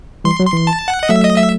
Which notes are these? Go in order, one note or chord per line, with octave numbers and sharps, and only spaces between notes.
E3 G3 C6
F#3
C6
E3
A5
F#5
D#5
F#3 A3 E5
D#5
E5